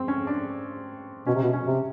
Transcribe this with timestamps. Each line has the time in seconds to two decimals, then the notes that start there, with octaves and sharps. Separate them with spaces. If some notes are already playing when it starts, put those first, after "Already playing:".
Already playing: C4
0.08 C#4
0.27 D4
1.27 B2 C#4
1.35 C3
1.43 B2
1.53 C#4
1.67 C3